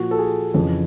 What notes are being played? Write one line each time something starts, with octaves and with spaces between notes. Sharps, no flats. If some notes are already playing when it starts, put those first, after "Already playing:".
Already playing: A#2 F3 F#4
A4
G#4
F2 C#3 E3